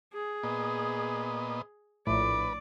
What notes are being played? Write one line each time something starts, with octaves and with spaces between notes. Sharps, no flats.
G#4
A#2 B3 D#5
A#1 A2 B4 D5